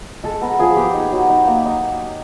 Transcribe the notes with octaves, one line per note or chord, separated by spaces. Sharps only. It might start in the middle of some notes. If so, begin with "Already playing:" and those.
G#3 A4
B3 A#4
F3 G#4
B3 G4
D#4
F#3
D#4
A#3
D#4